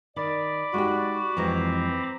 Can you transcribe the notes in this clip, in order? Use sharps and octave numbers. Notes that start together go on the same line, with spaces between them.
D#3 D5 B5 D6
G#3 D#4 F#4 G4
F2 E3 G#3 C4 C5 A#5